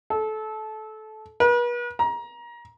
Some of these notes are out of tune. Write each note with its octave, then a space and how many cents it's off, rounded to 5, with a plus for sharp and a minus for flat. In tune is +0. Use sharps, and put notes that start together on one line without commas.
A4 -20
B4 -40
A#5 +25